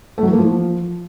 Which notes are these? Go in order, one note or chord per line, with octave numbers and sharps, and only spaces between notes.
A3
F#3
E3
A#3
F3